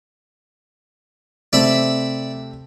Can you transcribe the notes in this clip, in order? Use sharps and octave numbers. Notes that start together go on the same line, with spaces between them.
C3 A3 C4 D5 E5 B5